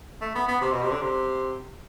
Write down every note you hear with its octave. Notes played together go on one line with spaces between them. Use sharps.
A3
B3
B3
C3
B2
C3
D3
C3